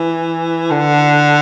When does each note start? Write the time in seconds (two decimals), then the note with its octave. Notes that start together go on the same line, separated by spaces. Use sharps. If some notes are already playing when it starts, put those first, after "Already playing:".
Already playing: E3
0.71 D3